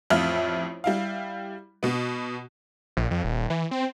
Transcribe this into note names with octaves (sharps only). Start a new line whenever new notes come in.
A1 F2 F4 E5 F6 F#7
G3 E4 F5
B2 B3
A#1
F2
D#1
E3
C4